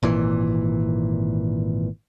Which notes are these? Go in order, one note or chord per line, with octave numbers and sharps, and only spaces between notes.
G#1 A#2 E3